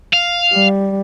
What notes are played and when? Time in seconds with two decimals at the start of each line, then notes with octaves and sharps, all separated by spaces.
0.14 F5
0.53 G3